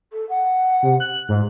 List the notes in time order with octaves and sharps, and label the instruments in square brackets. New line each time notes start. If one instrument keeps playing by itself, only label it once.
[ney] A4
F#5
[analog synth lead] C3
F#6
[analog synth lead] G#2 [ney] F4